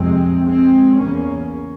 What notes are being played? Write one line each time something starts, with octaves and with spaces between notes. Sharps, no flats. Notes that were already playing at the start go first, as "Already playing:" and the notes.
Already playing: F2 C3 G#3 C4
G#3 C4
E2 C#3 A#3 C#4